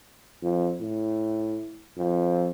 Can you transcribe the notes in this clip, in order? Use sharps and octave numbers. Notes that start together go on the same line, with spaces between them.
F2
A2
F2